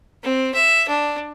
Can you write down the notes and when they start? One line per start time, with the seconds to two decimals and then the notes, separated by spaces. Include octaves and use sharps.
0.23 C4
0.54 E5
0.88 D4